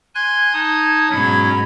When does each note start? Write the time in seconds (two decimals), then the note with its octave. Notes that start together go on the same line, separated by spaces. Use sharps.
0.15 G#5 C6 F#6 G#6
0.53 D#4 A5 D#6
1.09 G#2 B2 F#3 C#4 B5